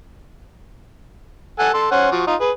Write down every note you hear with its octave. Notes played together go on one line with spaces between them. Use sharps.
A4 F#5 G#5
A4 C6
C#4 C5 F#5
F3 F#4
D#4 F4
G#4 B4